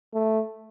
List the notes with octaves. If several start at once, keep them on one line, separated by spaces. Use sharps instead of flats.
A3